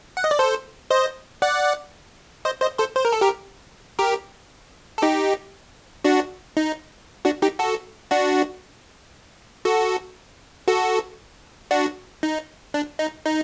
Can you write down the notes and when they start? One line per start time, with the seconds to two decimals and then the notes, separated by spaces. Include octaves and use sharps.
0.17 F#5
0.24 D#5
0.31 D5
0.39 A4 C5
0.90 C5 D#5
1.42 D5 F#5
2.45 C5 D#5
2.61 C5 D#5
2.79 A4 C5
2.96 C5
3.05 A#4
3.12 A4
3.21 G4 A#4
3.99 G4 A#4
4.98 A4
5.02 D#4 G4
6.04 D4 F#4
6.57 D#4
7.25 D4 F#4
7.42 D#4 G4
7.59 F#4 A4
8.11 D4 F#4
9.65 F#4 A4
10.68 F#4 A4
11.71 D4 F#4
12.23 D#4
12.74 D4
12.99 D#4
13.26 D#4